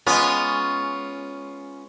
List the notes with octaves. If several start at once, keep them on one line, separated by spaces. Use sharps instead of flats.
G#3 B3 C#4 F4